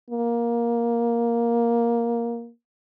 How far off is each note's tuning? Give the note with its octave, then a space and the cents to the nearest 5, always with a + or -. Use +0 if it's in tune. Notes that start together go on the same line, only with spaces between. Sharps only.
A#3 +10